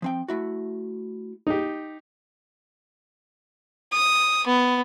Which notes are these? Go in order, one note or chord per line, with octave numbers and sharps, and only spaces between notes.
F3 C4 G5
A3 E4 F#4
D#4 G4
D#6
B3